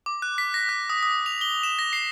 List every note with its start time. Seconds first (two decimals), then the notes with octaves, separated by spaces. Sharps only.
0.06 D6
0.22 F#6
0.38 B6
0.54 A#6
0.69 F#6
0.90 D#6
1.03 D#6
1.26 F7
1.41 G7
1.63 E7
1.79 A#6
1.93 C7